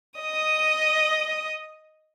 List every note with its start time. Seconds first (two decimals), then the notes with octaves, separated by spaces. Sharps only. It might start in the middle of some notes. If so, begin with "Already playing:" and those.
0.19 D#5 D#6